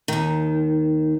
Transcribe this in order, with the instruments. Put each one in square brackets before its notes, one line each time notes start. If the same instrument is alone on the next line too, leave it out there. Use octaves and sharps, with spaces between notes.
[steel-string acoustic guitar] D#2 D#3